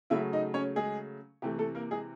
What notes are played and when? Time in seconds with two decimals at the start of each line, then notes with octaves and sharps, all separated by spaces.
0.10 C#3 F#3 A3 E4 E5
0.33 D#4 D#5
0.54 C#4 C#5
0.76 G#3 G#4
1.42 C3 E3 A3 G4
1.58 A3 A4
1.75 A#3 A#4
1.91 G#3 G#4